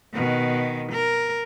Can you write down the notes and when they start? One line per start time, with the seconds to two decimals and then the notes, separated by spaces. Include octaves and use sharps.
0.14 B2 D#3
0.91 A#4